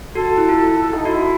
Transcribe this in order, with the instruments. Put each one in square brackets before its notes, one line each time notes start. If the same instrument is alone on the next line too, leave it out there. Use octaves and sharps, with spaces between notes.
[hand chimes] F#4 [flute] A4
[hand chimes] E4
F4
[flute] D#4
[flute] E4 [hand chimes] F#4